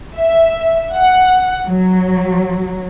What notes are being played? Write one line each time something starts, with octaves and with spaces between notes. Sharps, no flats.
E5
F#5
F#3